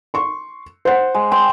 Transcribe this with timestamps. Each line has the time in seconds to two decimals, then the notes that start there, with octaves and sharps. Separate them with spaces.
0.14 C6 C#6
0.85 C5 F#5
1.15 G#3
1.32 G5 C6